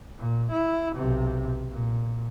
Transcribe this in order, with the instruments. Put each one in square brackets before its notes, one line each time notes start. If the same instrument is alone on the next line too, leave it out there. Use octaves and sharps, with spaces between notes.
[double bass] A#2
E4
B1 C3
A#2